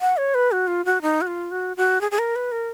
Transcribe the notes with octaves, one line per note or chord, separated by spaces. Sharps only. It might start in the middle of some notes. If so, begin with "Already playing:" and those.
F#5
C#5
B4
F#4
F4
F#4
D#4
F#4
F4
F#4
F#4
G#4
G#4
A#4
B4
A#4